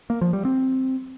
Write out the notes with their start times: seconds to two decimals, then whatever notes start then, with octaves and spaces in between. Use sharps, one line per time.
0.10 A#3
0.21 F3
0.33 G3
0.45 C4